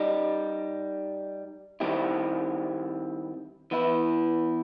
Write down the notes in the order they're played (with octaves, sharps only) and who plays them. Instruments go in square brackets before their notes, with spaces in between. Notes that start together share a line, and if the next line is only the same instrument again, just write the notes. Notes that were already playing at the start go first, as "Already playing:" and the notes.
Already playing: [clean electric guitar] G3 D#4 G4
D#3 G3 C4 E4 G4
E3 B3 E4